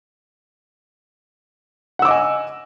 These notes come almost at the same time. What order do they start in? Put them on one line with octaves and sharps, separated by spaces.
F#5 E6 D6 D#5 G#5